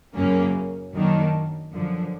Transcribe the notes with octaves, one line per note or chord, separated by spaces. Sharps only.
F#2 C#3 F#3 A#3 C#4
F#2 D#3 F#3 A#3 D4
F#2 D3 F3